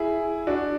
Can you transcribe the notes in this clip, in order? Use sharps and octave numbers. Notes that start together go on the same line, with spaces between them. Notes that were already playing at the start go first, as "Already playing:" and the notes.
Already playing: E4 G#4
D4 F#4